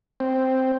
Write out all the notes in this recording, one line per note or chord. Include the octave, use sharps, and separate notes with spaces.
C4